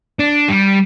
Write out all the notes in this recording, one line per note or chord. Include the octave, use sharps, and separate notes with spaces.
D4
G3